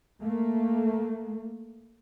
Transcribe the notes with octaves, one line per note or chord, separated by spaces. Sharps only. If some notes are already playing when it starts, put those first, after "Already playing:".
A3 A#3